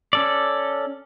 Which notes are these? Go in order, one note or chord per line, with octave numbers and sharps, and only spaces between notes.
C#4 A4 D5